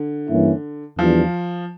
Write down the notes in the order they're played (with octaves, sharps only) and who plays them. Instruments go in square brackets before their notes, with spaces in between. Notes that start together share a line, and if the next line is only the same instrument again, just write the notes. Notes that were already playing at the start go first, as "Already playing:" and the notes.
Already playing: [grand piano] D3
[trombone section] G2 E3 A#3 C#4 E4
[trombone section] E2 E3 G3 D4 F4 [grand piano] F3